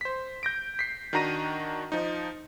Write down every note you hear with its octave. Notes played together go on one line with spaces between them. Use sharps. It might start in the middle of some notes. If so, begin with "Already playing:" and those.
C5 B6
G6 A#6 D7
B6 C7
D#3 D4 F#4 A#5 A#6 D#7
F3 D#4